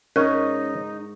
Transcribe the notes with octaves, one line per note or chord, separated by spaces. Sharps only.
G#2 C#4 D#4 A#4 D#5 C#6